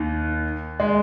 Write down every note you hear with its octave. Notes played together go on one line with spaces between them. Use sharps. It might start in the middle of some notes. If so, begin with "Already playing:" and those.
Already playing: D#2 D#3
G#3